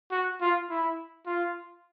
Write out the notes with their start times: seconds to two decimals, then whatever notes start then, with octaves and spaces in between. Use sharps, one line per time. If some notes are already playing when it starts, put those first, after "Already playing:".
0.11 F#4
0.41 F4
0.70 E4
1.27 F4